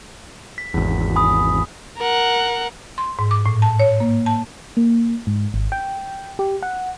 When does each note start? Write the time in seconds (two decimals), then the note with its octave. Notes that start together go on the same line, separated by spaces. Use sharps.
0.58 B6
0.74 G#1 E2
1.16 G#5 B5 D#6
1.98 A#4 F#5
2.98 C6
3.19 G#2
3.31 D6
3.46 A2
3.62 A5
3.80 C#5
4.00 A#3
4.26 A5
4.77 A#3
5.27 G#2
5.54 G#1
5.72 G5
6.39 G4
6.63 F#5